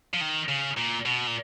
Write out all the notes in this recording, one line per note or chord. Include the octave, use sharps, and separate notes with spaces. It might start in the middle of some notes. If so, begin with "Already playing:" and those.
F3
D#3
C#3
A#2
B2
A#2